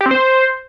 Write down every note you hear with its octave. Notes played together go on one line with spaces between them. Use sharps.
G4
C4
C5